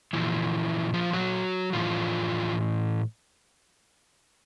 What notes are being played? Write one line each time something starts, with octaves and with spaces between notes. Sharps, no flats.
A#2 E3 F3 E4
F3 F4
F#3 F#4
A2 E3 F3 F4